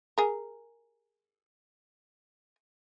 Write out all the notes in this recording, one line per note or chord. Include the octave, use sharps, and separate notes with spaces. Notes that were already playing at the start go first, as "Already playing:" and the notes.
G#4 A#4